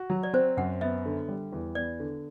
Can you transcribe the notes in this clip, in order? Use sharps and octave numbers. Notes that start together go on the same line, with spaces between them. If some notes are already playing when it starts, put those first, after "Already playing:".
Already playing: F#4
F#3
D5
C4 C5
F#2 F#5
B3 E5
D3
G3
E2
B3 D5
D3